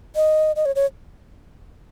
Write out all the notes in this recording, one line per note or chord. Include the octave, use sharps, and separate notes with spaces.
D#5
D#5
C#5
C#5